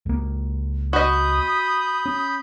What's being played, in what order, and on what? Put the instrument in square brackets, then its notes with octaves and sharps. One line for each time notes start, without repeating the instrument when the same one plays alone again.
[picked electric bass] C#2 A#3
[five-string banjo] F#4 D#5 [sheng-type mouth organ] B5 G6 [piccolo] D#6
[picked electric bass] C#4